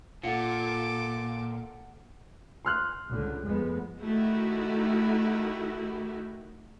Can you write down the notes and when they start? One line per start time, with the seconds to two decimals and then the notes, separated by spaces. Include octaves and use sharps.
0.23 A#2 F4 A4 F#5 D6 C#7
2.65 C6 F6 F#6
3.08 C#2 D3
3.43 F2 G#3 B3
4.02 D#3 A3 D#4 E4 F#4 G4